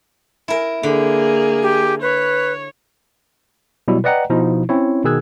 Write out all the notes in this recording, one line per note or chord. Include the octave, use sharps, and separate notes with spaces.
E4 A#4
D3 A#3 G#4
G4
B4 C#5
B2 F#3 G3 E4
B4 D5 D#5 F#5 G5 A#5
B2 F3 D#4 E4
C4 C#4 E4 C#5
B2 D#3 G#4 E6 F#6 G#6